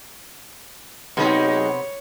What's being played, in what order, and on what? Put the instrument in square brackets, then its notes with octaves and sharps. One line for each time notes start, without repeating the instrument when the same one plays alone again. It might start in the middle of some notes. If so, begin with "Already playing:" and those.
[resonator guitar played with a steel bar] C3 B3 [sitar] F#3 G#3 D#4 [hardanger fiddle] C#5